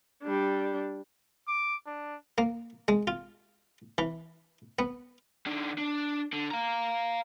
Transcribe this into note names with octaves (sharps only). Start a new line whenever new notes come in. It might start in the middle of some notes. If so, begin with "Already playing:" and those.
G3 D4
D6
D4
A#3
G#3
F4
E3
B3
D#3 D4
D4
D3
F5 A#5